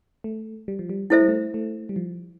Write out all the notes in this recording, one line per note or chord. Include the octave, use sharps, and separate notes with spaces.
A3
G3
F3
G3
A3 E4 A4 C5 E5
G3
A3
A3
G3
F3